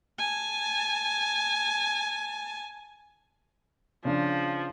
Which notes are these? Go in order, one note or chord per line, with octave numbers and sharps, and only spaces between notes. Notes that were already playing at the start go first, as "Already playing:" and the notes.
G#5 A5
C#3 F3 D4